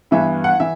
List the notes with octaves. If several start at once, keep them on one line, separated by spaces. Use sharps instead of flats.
G2 E3 B3 E4 E5
F#5
E3 E5